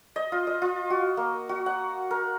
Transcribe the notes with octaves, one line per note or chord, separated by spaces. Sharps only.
D#5
F4
D#5
F4
F#4
A#3
F#4
F#5
A#4